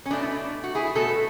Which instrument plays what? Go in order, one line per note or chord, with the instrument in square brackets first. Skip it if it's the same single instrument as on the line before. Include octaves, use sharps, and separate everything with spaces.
[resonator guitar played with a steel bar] C#4
B2 A3 D4
E4
D4
F#4
E4 G#4
B2 A3 F#4 A4